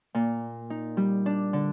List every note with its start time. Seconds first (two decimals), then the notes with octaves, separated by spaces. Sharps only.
0.14 A#2
0.70 D#4
0.97 G3
1.26 D4
1.53 D3